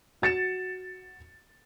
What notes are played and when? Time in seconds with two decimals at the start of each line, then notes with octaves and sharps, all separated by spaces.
0.22 F#4 A6 C#7 E7